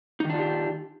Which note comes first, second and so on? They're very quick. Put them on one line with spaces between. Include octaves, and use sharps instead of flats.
D#4 D#3 D4 F4 G4